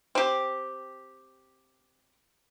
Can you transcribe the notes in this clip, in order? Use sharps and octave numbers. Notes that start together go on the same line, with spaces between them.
C4 G4